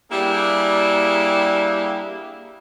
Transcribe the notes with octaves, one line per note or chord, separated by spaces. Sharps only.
G3 A#3 D4 E4 G4 G#4